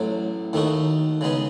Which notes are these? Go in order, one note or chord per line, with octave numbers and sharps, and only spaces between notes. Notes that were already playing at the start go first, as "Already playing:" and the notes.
Already playing: A1 A2 F#3
D#2 D#3 A3 D#4 F#4
C#3 G#3 B3 D#4